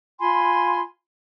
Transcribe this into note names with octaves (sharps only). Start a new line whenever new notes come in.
F4 G#5 B5 C6